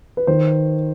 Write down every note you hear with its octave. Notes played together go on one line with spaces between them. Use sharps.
B4
D#3 C5